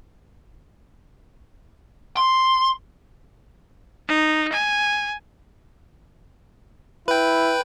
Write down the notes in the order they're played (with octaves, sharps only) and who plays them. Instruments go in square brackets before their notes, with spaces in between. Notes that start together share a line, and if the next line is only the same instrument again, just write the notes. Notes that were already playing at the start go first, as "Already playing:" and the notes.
[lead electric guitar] C6
[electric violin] D#4
G#5
[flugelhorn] E4 [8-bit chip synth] B4 G5